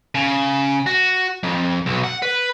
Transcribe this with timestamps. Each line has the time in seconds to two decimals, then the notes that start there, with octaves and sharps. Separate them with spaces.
0.15 C#3
0.86 F#4
1.43 F2
1.86 B1
2.04 F#5
2.22 B4